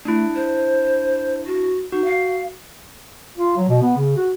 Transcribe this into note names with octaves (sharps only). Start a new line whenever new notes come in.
A3 D4 E4
C5
F#4
D#4 F#4
F5
F4
F#3
B2
B3
C#3
F#4